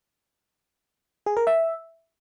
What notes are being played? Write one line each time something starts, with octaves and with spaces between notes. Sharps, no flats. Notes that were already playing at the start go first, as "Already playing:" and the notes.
G#4
A#4
E5